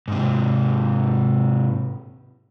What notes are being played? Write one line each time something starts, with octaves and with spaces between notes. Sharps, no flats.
G#2 C3